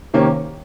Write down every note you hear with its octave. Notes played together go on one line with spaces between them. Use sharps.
C3 D#3 A#3 C#4